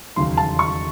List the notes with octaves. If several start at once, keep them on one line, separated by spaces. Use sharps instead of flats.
E1 D#2 C#3 F#3 C6
A5
C#6